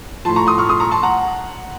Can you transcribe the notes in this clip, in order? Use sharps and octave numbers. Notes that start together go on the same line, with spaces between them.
A2 F3 A5 C6
A#5 C#6
C6 D#6
C#6 F6
C6 D#6
A#5 C#6
A5 C6
F#5 A#5